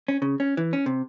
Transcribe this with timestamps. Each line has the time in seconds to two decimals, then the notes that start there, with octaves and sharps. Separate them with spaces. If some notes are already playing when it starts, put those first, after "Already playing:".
0.08 C#4
0.22 C#3
0.40 C#4
0.57 E3
0.73 C#4
0.86 C3